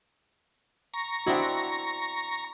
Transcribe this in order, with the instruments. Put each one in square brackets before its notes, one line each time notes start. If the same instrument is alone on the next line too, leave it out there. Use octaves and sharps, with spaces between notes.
[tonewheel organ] A#5 C#6 A#6
[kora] C4 D4 E4 [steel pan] F#4 D#5 E5